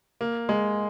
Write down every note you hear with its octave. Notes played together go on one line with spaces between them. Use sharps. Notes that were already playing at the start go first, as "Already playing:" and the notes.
A#3
G#3